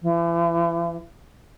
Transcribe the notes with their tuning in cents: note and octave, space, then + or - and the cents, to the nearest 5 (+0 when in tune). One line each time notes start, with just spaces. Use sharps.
E3 +40